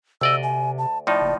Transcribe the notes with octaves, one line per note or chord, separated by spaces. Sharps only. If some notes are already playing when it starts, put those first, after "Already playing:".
D2 C3 D5 D#5 E6
G#5
A5
A2 F3 D#4 D5
F#1